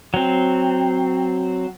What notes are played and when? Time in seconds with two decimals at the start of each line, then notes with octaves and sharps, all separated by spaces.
0.14 F#3 C4